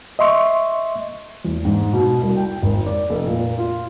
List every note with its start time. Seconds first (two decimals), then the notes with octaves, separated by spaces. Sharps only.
0.19 D#5 E5 C6 C#6
1.45 E2
1.65 G#2
1.93 B2
2.22 C2
2.37 G5
2.63 G#1
2.86 D5
3.10 F1
3.27 A#2
3.58 F4